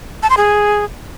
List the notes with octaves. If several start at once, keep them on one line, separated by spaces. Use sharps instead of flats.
A5
C6
G#4